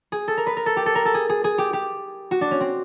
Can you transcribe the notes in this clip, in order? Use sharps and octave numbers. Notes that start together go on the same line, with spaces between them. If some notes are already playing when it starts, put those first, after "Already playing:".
G#4
A4
A#4
B4
A#4
A4
G4
A4
A#4
A4
G#4
G#4
G#4
G4
G4
F#4
D4
C#4
C4